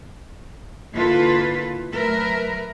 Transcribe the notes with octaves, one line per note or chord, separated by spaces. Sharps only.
D3 A#3 E4 F4 A4 B4
F#3 A3 A#4 B4 E5